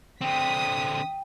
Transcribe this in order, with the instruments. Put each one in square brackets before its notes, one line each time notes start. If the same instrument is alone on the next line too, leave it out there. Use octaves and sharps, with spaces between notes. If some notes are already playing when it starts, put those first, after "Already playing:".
[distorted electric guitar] D3 C4 [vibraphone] G5 [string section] D#6 B6